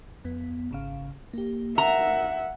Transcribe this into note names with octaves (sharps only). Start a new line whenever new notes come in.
F2 B3
G#1 C#3 F5
A#3 G4
A#4 E5 F#5 A#5